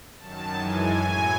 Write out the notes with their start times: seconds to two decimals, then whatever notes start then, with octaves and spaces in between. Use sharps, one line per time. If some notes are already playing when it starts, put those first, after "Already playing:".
0.18 F#2 D#3 F#3 A5
0.55 F#2 E3 G#3 G#5
0.91 A2 F#3